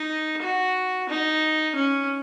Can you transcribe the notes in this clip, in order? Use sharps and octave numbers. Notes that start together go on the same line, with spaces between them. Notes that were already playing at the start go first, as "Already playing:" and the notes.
Already playing: D#4
F#4
D#4
C#4